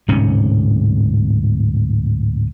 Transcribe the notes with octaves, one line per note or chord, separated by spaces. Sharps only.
D1 G#2 C3 C#4